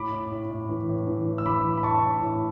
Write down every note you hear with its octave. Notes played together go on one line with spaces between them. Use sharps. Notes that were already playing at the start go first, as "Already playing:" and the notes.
Already playing: A2 B5 D6
A2
A2
A2
E3
A2
E3
A2
E6
E3 B5 D6
A2
B5
A2 A5 C#6
A2
A2